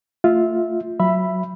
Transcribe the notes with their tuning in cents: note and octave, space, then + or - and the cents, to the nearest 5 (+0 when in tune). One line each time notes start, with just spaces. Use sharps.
A3 +25 F4 +0 E5 -15
F#3 -5 E5 +15 B5 +0